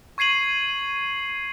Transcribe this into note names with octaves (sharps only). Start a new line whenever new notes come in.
C#6 G#6 C7 D#7 F#7